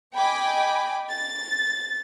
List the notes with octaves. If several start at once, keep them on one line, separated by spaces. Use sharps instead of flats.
D#5 G5 G#5 B5 D6
A6